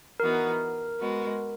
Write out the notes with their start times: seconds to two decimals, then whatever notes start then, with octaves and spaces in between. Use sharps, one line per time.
0.20 E3 B3 D#4 F#4 A#4
0.99 G#3 B3 F#4